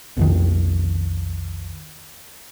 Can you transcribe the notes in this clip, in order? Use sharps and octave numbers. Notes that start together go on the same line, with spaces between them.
B1 F2 D#3